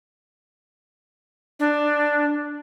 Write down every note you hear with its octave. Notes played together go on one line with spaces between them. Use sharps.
D4